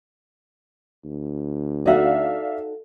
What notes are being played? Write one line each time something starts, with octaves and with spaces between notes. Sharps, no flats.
D2
D#4 F#4 A4 D5 E5 F5